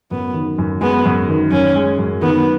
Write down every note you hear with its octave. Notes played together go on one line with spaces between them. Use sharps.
F#2 B3
D#3
F#2
G#3 B3
F#2
D#3
F#2 C#4
G#3
F#2
D#3 B3